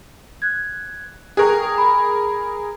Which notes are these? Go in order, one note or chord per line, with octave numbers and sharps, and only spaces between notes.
F#6 G#6
G#4 A#4 G5 C#6 F#6
D#6
B5